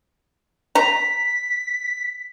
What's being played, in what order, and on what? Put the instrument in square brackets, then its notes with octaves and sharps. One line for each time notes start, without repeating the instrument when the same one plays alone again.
[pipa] A#5 [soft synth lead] B6